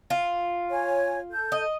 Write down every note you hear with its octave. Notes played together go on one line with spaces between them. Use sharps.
F4
C#5 G#5
A4 G6
D#5